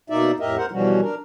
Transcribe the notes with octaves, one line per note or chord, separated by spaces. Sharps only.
B2 A#3 D#4 D5 E5
F2 A2 G4 A#4 D#5 E5
A#4 C5 F#5
B2 E3 F3 G3 C#4 F#4
D4 A#4